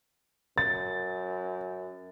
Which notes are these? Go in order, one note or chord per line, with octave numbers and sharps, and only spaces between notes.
F#2 A6